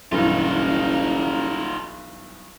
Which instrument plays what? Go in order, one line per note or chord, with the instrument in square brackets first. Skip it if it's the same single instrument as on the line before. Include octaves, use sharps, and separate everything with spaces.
[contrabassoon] F#1 [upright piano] B1 G2 E3 [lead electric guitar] D#4 F4